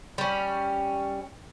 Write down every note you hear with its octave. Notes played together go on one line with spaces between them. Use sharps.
G3 C#4